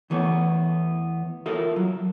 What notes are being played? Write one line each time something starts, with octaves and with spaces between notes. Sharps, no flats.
E2 E3 A3 B3 C#5
E4 F4 A4 A#4
F#3